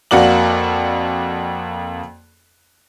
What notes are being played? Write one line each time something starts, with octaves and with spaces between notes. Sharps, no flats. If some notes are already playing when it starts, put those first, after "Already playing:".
F2 A#3 F#4 D5 F#7